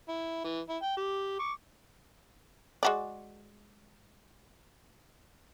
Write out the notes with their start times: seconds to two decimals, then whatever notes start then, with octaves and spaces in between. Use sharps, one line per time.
0.08 E4
0.44 E3
0.69 E4
0.82 G5
0.97 G4
1.39 C#6 D6
2.83 G#3 F#4 D5